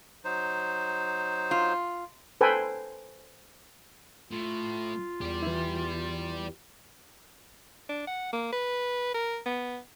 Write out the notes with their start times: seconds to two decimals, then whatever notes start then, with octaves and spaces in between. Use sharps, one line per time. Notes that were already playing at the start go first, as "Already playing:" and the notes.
0.25 F#3 D#4 C5
1.51 F4
2.41 A4 B4 C5 G5 G#5
4.31 A2 F4
5.21 E2 G4 D5
5.43 E3 E4
7.89 D4
8.07 F#5
8.33 A#3
8.52 B4
9.14 A#4
9.46 B3